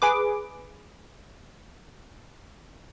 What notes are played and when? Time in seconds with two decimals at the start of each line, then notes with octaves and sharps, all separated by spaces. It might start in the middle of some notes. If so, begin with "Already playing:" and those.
0.02 G#4 B4 D6